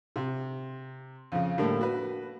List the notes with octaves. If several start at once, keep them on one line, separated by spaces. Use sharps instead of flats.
C3
F2 C#3
A2 D3 G3 A3 A#3
F#4 B4